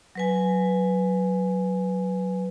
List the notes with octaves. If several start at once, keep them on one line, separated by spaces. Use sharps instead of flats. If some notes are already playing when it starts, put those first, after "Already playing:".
F#3 B4 G#5